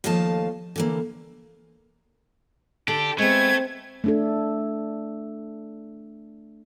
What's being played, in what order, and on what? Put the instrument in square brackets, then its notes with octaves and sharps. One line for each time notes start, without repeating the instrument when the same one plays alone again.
[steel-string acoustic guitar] D#2 F3 A3 D#5 F5 A5
D3 E3 A#3
[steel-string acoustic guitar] D3 [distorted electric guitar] G4 [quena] A5
[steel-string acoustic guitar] G#3 B3 [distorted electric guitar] A3 [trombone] C4 [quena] G#6
[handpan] A3 D4 A4